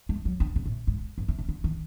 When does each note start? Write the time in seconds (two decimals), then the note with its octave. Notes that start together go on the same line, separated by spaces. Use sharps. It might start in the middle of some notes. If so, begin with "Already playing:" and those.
0.09 G#3
0.25 F#3
0.40 D3
0.56 C#3
0.66 A2
0.87 G#2
1.18 G2
1.28 C3
1.38 C#3
1.49 D3
1.64 D#3